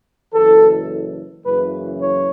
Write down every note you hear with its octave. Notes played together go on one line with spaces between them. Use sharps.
F#1 F#2 E3 A4
F#1 F#2 C#3 E3 B4
C#5